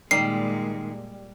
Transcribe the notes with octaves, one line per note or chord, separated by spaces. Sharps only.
A#2 D#3 G3 G#3 C7